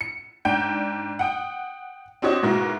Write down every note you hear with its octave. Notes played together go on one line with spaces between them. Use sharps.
C#7
G#2 D4 G5 G6
F#5 G5 D#6
C4 D4 F#4 G4 C#5 D#5
G#2 B2 G#3 A#3 E4 F#4